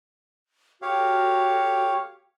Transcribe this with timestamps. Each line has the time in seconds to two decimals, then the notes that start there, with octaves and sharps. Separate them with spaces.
0.82 F#4 G4 A4 C#5 F5